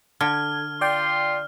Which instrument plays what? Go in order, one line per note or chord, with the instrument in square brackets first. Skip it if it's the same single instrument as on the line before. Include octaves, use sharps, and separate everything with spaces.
[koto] D3 [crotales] F6 [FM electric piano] G#6
[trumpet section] F4 C6 [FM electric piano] D5 G5